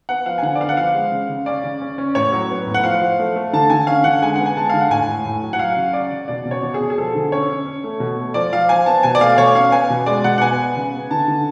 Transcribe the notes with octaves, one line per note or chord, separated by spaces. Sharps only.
B3 F#5
F3 F5
G#5
D3 F#5
D5
B3 F5
F#5
F3 F5
G#3
C#3
C#3
C#4 D5
C#3
C#4
C#4
A2 C#5
F#3
B3
A2
F#5
F3 F5
F3
A3
A3
D3 A5
D3 G#5
C#4 F5
D3 F#5
G#3 G#5
B3 F#5
G#5
G#3 A5
D3 F5
F#5
A2 G#5
A2
A2
F#3
F#5
F#3 F5
C#3
C#4 D5
C#3
B2 D5
B2
C#5
B2
G#4
B2
G#4
F3 A4
D3
C#4 C#5
C#4
C#4
A3
B2
A3
F3 D5
F3 F5
F3 G#5
B3 A5
B2 G#5
D5
A3 F5
B2 C#5
C#4 F5
B3 G#5
B2
G#3 D5
B2 F#5
F#5
B3 G#5
B3
C#3
B3
D3 A5
D3